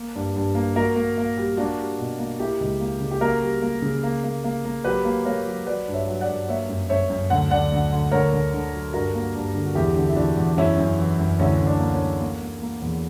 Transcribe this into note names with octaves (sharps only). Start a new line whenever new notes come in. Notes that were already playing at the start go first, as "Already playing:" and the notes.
Already playing: A#3
G2
G2
A#3
A#3 F#4 A#4
A#3
A#3
G3
A#3 D4 F#4
G3
B2
A#3
A#3 E4 G4
C#2
A#3
C#3
G4
A#3 F#4 A#4
G3
A#3
C#3
A#3
A#3
A#3
A#3
F#3 G4 B4
A#3
A#3 A#4 C#5
F#3
F#3 B4 D5
G2
C#5 E5
F#3
D5 F#5
G2
A#3 C#5 E5
F#2
F#2 C#5 E5
F#2
D2 F#5
D2 D5 F#5
D2
D2
D2 A#4 C#5
D2
D3
F#3
G2 F#4 A#4
A#3
G2
D3
F#4
E2 E4 G4
D3
E4
E2 D4 F#4
E2
F#2 C#4 E4
F#2
E3
F#2
D2 C#4 E4
D2
D4
A#3
C#4
A#3
A#3
A#3
A#3
E2